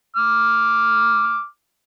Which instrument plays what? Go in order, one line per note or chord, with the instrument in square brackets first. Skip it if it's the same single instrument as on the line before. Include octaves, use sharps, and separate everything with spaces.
[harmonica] D6 F6